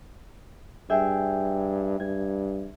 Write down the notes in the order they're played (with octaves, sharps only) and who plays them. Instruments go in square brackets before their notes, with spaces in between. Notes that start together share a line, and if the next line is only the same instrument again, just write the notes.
[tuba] G2 [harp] G#4 E5 G5
[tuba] G2 [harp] G#6